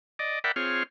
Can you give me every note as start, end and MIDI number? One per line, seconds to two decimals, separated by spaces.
0.19 0.39 74
0.19 0.39 75
0.44 0.52 70
0.44 0.52 74
0.44 0.52 76
0.44 0.52 78
0.44 0.52 79
0.44 0.52 83
0.56 0.83 60
0.56 0.83 65
0.56 0.83 68
0.56 0.83 73
0.56 0.83 89